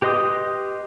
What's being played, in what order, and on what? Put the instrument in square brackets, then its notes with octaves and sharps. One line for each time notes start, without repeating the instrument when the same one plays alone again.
[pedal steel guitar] G4 B4 D#5 C6 D#6